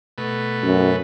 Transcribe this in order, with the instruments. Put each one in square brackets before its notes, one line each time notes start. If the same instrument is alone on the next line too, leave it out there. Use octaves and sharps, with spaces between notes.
[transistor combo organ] B2 A3 B4
[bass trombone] F#2